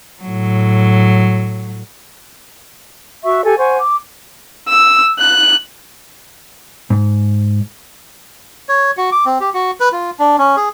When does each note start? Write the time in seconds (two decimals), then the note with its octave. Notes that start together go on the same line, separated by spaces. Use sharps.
0.22 A2 F#3
3.24 F#4 E5 C#6
3.45 G4 A4 G#5
3.58 C5 F#5 G#5 C#6
3.78 D6
4.68 E6
5.19 F#6
6.90 G#2
8.69 C#5
8.97 F#4
9.12 D6
9.26 C4
9.40 G4
9.54 F#4
9.80 B4
9.92 F4
10.19 D4
10.38 C#4
10.57 G#4